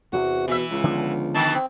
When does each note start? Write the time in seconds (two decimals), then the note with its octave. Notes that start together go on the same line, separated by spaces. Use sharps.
0.13 E2 C3 F#4
0.48 B2 E3 E5
0.71 C#2
0.84 D3 F3 B3
1.34 B2 D#3 A5
1.54 C4